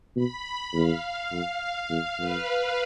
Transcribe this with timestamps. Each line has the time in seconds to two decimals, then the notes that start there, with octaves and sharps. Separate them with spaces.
0.16 B2 B5
0.74 E2 F5
1.32 F2
1.62 F5
1.90 E2
2.19 F2 B4